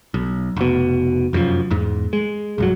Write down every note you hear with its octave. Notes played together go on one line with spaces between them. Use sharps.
B1
F1 B2
F1 F#2 C3 F3
E2 G#2
G#3
B1 G2 F#3